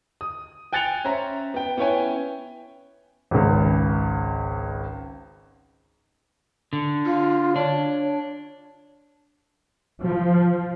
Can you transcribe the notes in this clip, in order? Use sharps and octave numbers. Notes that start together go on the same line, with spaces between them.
D#6
G5 G#5 F#6 A6 C#7 F7
C#4 C5 E5 A#5
B3 G5
B3 C#4 E4 C#5 G5 G#5
G#1 C#2
D3
F4
D4 C#5
F3